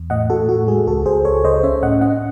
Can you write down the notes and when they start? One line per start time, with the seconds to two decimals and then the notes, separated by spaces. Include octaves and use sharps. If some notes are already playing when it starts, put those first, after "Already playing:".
Already playing: E2
0.10 A2 D#5 F#5
0.30 A2 F#4 A4
0.49 A2 F#4
0.68 G#3 G#4
0.87 C#2 F#4 A4
1.06 C#2 G#4 C5
1.25 C#2 A4 C#5
1.44 C#2 C5 D#5
1.63 C#4 C#5 E5
1.83 A2 D#5 F#5
2.01 C#4 D#5 F#5